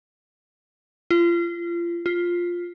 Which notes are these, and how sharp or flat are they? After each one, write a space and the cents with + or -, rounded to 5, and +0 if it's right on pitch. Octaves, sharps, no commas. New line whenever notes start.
F4 -30
F4 +5